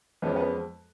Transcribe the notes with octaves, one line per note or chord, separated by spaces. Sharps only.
F2 F3 G#3 B3 C#4 B4
B3 B4